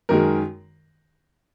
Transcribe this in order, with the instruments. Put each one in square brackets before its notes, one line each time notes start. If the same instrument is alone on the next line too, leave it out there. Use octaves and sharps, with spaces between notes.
[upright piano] F#2 D#3 G#3 A#4